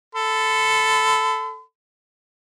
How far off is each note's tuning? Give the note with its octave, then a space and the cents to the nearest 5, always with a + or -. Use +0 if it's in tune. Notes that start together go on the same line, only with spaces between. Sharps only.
A4 +0 B5 +45